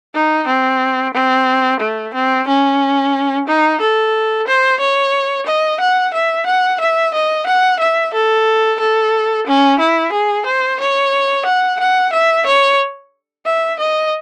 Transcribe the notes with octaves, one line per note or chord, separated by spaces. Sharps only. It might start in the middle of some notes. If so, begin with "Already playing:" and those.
D#4
C4
C4
A3
C4
C#4
D#4
A4
C5
C#5
D#5
F#5
E5
F#5
E5
D#5
F#5
E5
A4
A4
C#4
E4
G#4
C5
C#5
F#5
F#5
E5
C#5
E5
D#5